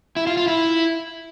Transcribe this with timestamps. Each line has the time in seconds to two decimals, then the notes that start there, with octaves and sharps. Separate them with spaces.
0.16 E4
0.27 F4
0.37 F4
0.48 E4